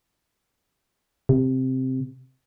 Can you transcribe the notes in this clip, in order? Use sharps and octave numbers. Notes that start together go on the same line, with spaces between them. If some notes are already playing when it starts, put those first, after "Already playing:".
C3